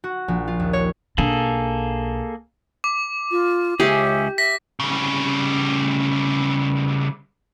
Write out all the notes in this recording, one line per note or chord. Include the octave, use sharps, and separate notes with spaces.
F#4
A#1
F4
D#2
C#5
B1 A#3 D4 G#4 A4
D6
F4
C#2 C#4 G4 G#4 E5
E5 A#6 B6
C#3 G3